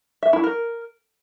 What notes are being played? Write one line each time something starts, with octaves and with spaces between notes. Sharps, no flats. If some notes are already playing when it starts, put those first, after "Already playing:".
E5
E4
A#4